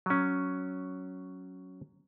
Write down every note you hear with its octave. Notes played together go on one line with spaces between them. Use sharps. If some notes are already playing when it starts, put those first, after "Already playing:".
F#3 C#4